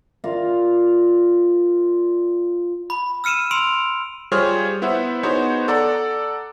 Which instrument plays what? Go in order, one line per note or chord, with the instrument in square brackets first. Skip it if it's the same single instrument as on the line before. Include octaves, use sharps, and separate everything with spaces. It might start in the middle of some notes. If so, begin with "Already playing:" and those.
[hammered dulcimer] F4 A#4 D5 F5
[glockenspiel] B5
E6 F6 C#7 D#7 E7
C6 E6 D7 F7
[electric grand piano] G3 F4 G#4 C5 C#5 F6
B3 E4 C5 E5 F#5
B3 D#4 F#4 G#4 C5 C#5
A4 D5 F#5 A#5